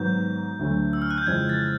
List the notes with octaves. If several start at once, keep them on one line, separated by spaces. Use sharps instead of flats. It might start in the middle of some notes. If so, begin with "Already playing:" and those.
Already playing: G#2 D#3 F#3 B3 G6
D2 D3 F#3 A3
E6
F6
F#6
G6
F2 C#3 E3 G#3 C4 G#6
A6